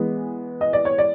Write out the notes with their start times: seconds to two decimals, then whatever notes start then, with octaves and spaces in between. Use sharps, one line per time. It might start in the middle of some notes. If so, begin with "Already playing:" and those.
Already playing: E3 G#3 B3
0.61 D#5
0.73 D5
0.85 C#5
0.98 D5